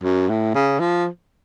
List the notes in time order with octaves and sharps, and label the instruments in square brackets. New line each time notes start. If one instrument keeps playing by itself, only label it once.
[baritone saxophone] F#2
A2
C#3
F3